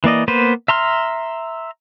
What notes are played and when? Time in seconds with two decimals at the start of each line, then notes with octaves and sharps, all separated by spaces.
0.04 E3 A#3 D5 D#5
0.28 A#3 B3 B4 C5
0.68 E5 A#5 C6 F6